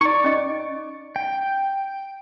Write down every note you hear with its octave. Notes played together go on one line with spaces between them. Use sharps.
D#4 D5 A#5 C#6
C#4 D#5
G5